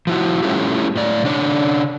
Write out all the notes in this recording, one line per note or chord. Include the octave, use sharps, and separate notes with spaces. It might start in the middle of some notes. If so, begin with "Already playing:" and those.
F3 E4 F#4
G3 A3 C#4 E4 F4 G4
A2 D5
C#3 D4 C#5 D5